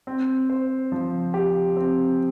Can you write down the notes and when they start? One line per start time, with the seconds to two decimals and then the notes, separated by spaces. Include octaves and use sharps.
0.07 C4
0.50 C5
0.92 F3
1.34 G4
1.76 C4